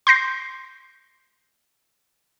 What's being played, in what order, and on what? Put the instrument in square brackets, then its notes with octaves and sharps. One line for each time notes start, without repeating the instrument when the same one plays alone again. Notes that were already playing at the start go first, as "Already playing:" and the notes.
[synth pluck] C6 G6 A#6 C7